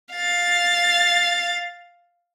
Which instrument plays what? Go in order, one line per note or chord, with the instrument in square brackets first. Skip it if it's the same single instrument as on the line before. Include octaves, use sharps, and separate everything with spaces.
[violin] F5 A6